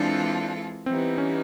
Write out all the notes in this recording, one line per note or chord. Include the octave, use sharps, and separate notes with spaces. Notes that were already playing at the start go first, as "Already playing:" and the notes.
Already playing: E3 G#3 C4 D4 F4 A4
E3 G3 B3 C4 D#4
C#4